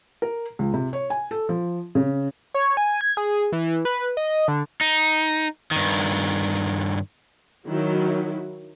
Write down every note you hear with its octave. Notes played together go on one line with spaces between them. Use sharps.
A#4
C#2
C3
C#5
G#5
A4
F3
C#3
C#5
G#5
G#6
G#4
E3
B4
D#5
D3
D#4
G2 D#3
D#3 F#3 E4